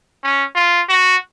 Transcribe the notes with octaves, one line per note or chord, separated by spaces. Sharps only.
C#4
F4
F#4